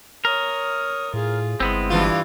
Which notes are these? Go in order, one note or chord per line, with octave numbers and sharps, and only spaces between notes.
A#4 C#5 D#6
A2 F4 G#4
G1 G#3 B3 C4 E4
G2 E3 F4